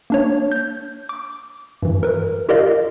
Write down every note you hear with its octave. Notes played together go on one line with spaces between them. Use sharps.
A#3 D4 C#5
G6
D6
G2 E3
A#4 B4
F4 G4 A#4 D5 D#5 F5